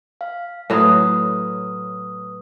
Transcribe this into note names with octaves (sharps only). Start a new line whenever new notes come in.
F5
A2 F#3 B4 D#6